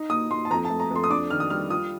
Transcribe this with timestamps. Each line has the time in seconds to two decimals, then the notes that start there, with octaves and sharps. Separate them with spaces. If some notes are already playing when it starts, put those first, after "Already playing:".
Already playing: D#4
0.10 A#2 D#6
0.30 A#2 C6
0.45 A5
0.51 F2 A#5
0.65 A5
0.70 A3
0.80 A#5
0.91 F2 C6
1.04 D#6
1.10 D4 D6
1.30 D#3 F6
1.40 D#6
1.50 G3 F6
1.70 F4 D#6